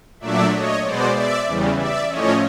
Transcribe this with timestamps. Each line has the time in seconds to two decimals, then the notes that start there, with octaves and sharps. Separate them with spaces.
0.20 A#2 F#3 A3 D4 D5 E5
0.52 C#5 D#5
0.84 B2 G#3 B3 C5 D5
1.14 D5 E5
1.46 E2 C#3 E3 G3
1.77 D5 E5
2.09 A2 F3 A3 C#4 C#5 D#5